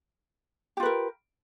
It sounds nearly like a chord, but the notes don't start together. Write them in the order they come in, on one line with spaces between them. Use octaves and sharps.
G4 F4 B4 A#4